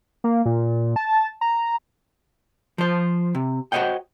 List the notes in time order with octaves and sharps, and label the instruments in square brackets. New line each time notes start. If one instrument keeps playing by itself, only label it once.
[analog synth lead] A#3
A#2
A5
A#5
[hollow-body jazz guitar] F3 C5
C3
F#4 C5 C#5 D#5 F#5 G5